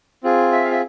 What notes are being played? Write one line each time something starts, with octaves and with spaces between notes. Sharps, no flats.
C4 F4 G#4
E5
F5
E5